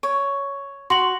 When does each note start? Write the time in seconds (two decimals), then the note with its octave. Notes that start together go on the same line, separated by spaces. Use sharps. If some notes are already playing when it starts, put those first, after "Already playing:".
0.03 C#5
0.90 F#4 C6 F#7